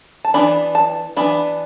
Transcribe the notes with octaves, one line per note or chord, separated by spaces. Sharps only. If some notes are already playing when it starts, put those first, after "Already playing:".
A5
E3 B3 D4 B5
A5
E3 B3 D4 B5